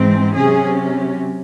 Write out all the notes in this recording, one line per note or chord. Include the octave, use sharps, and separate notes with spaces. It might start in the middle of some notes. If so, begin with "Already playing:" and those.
Already playing: G#2 E3 G#3 C4
C3 F#3 C#4 G#4